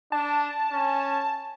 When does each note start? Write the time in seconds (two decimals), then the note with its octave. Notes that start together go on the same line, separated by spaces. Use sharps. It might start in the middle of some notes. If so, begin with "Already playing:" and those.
0.12 D4 A5
0.71 C#4